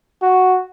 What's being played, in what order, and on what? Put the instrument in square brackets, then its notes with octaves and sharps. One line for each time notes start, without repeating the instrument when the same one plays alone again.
[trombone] F#4